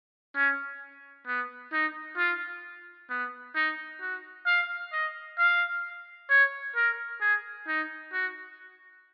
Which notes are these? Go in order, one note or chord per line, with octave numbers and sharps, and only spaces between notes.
C#4
B3
D#4
F4
B3
D#4
F#4
F5
D#5
F5
C#5
A#4
G#4
D#4
F#4